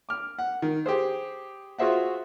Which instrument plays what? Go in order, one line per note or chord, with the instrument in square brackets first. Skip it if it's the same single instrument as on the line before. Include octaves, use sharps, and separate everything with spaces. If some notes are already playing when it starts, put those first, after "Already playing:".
[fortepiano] D6 F6
F#5
D#3
G4 G#4 C5
F4 F#4 G#4 C5 E5 F#5